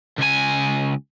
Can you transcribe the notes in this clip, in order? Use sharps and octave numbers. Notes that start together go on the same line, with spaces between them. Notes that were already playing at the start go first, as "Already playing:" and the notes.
C#2 G#5